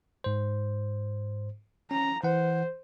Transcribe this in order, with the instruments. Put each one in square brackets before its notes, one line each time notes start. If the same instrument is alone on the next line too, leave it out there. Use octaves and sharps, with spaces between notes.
[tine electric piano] G#2 C5
[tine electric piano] C#4 [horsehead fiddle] A#5
[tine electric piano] E3 F#5 [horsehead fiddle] C5